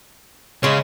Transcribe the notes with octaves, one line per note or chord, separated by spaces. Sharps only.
C#3 G#3 C#4